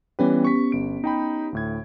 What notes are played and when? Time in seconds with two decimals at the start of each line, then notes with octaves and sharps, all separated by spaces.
0.19 E3 G3 B3 C#4 G4 B4
0.45 C#6 B6
0.72 G1 D7
1.04 D#4 G5 B5
1.53 D2 A2 G#6